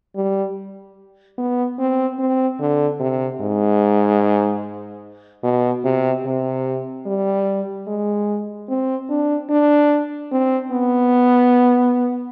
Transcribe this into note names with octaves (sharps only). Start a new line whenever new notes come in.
G3
B3
C4
C4
D3
C3
G#2
B2
C3
C3
G3
G#3
C4
D4
D4
C4
B3